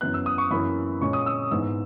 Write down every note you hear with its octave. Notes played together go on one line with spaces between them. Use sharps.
F#2 E3 B3 F#6
E6
D#6
C#6
F#2 E3 A#3 E4 B5
A#2 G#3 C#4 C#6
D#6
E6
G#2 E3 G#3 B3 D#4 E6